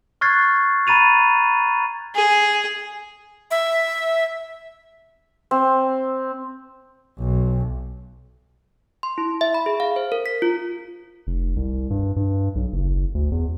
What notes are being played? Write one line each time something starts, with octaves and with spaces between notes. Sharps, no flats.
C#6 F6 F#6 G#6 A6 C7
A#5 B5 A6 D#7 F7
G#4
E5
C4
B1
C6
E4
E5
B5
G#4
F5
C5
A#4
B6
F4
F1
C2
G2
G2
B1
F#1
D2
E2